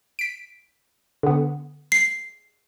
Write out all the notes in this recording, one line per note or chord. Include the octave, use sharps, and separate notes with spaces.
B6 D7
D3 B3
C7